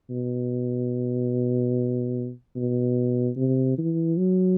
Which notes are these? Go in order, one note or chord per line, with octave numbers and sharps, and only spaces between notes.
B2
B2
C3
E3
F#3